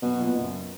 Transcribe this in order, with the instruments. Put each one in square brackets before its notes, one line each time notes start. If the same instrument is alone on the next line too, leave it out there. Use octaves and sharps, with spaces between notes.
[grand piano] B1 [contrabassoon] B2
[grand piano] A#2
F#1